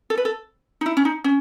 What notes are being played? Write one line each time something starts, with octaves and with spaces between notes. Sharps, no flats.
A4
B4
A4
D#4
E4
C#4
D#4
C#4